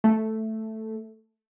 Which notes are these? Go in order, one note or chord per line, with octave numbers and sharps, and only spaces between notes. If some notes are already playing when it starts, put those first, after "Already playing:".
A3